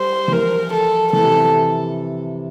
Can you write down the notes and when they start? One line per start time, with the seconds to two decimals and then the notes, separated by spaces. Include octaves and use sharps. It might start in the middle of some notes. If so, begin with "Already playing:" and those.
Already playing: G3 C5
0.28 E3
0.33 F3 A#4
0.73 A4
1.13 E3 A4
1.23 C3